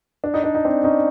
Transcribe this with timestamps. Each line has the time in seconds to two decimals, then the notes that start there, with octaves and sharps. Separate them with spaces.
0.24 D4
0.34 D#4
0.44 D4
0.55 D#4
0.65 C4 D4
0.84 C#4 D#4